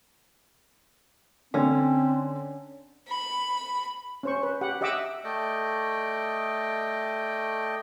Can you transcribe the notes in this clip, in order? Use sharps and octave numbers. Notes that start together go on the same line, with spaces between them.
D3 C4 C#4
B5
C#4 C5 C#6
B4
G4 F#5
G4 D#5 E5 F#5 D6 E6
A3 D5 D#5 G5